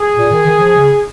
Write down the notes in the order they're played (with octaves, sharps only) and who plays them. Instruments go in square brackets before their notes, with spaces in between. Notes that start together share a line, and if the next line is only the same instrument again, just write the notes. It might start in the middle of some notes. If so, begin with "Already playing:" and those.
Already playing: [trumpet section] G#4
[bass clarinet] A#2
D#3
D#3
F3
C#3